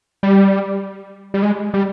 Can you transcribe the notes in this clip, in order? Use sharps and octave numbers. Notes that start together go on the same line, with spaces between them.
G3
G3
G#3
G3